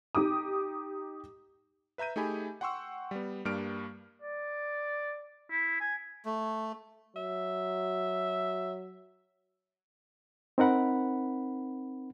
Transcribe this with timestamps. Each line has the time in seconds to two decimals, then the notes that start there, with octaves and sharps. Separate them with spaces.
0.15 D#4 G4 D6 D#6
1.98 B4 E5 A#5 G6 D#7
2.16 A3 D#4 G4 G#4 G#5 B5
2.61 F#5 G5 C6 C#6 E6
3.11 G3 B3
3.45 G2 G3 A#3 D4 F6 D7
4.22 D5
5.51 E4
5.80 G#5
6.25 A3
7.16 F#3 E5
10.58 C4 D#4 A#4 F#5 B5